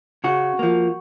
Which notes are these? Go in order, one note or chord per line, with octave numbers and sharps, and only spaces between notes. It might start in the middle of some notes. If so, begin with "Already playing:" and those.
C#3 F#4
F3 A#3